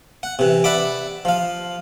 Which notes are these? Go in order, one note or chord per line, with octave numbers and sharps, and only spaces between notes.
F#5
C3 E3
D5 E5 F#5 B5 D6
F3 F5